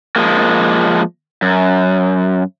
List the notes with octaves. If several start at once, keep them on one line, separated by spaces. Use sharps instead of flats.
F3 G#3 A#3
F#2